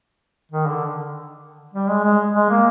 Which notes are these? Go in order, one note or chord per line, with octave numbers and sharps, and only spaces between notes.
D#3
D3
G3
G#3
G#3
G#3
A#3